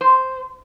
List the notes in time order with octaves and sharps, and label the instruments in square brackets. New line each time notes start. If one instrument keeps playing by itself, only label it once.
[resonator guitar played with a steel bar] C5